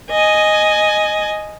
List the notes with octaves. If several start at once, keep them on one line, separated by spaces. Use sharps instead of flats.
D#5 G#5